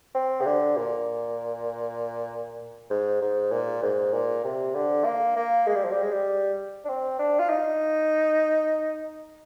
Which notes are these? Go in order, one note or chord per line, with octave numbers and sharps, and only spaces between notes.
C4
C3
D3
A#2
G#2
G#2
A#2
G#2
A#2
C3
D3
A#3
A#3
G#3
G3
F3
G3
G#3
G3
D4
C4
D4
F4
D#4